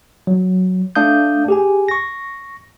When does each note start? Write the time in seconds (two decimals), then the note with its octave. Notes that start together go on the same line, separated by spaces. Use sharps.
0.27 F#3
0.95 A3 D4 F5 D#6 G6
1.48 G4 G#4 G#5
1.88 C#6 A#6